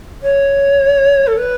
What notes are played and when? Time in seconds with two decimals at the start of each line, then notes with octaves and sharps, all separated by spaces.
0.22 C#5
1.27 A4
1.37 B4